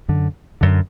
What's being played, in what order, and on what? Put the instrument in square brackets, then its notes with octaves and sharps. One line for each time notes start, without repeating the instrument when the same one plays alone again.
[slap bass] F#2 D3
F#2 D3